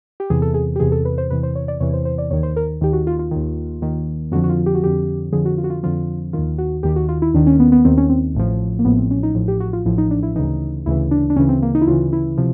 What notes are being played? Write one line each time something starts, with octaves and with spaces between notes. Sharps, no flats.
G4
E2 C3 E3 G#4
A4
G#4
G4
E2 C3 E3 G#4
A4
B4
C5
E2 C3 E3 B4
C5
C#5
D5
E2 C3 E3 C#5
C5
C5
D5
D#2 D#3 C#5
C5
A#4
D#2 D#3 G4
F#4
F4
F4
D#2 D#3
D#2 D#3
F2 D3 F3 F#4
F#4
F4
G4
F#4
F2 D3 F3 G4
F2 D3 F3 G#4
F#4
F4
F#4
F4
F2 D3 F3 F4
D#2 D#3 F4
F#4
D#2 D#3 G4
F#4
F4
E4
D#2 D#3 D4
C#4
B3
B3
D#2 D#3 C4
C#4
C4
A1 A2 F3
A#3
A1 A2 F3 B3
C4
C#4
D#4
A1 A2 F3
G4
F#4
F4
A1 A2 F3 E4
D#4
D4
E4
D2 C#3 E3 D#4
D2 C#3 E3 E4
D4
D4
D2 C#3 E3 C#4
C4
A#3
D#4
E4
D2 C#3 E3 F4
E4
C3 F3